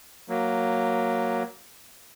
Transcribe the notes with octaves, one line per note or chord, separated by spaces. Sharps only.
F#3 A#3